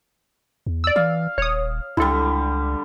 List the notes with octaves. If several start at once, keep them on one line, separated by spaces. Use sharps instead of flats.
E2
D5 E6
E3 F5
D#1 C#5 D#6
C#2 D3 G3 E4 A4